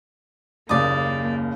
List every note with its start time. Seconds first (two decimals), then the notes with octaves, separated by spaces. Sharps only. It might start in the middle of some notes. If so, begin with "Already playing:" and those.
0.69 F#1 D#2 C#3 A#3 D5 D#6